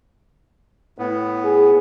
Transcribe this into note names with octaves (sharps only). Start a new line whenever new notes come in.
A2 B3
G#4